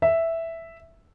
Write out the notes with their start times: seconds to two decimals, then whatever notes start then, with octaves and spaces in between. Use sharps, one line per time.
0.02 E5